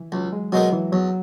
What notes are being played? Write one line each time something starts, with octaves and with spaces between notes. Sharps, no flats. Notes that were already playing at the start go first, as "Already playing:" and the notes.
Already playing: E3
C#2 F#3
G#3
B2 F#3 G#3 D#4 A#4
E3
E2 F#3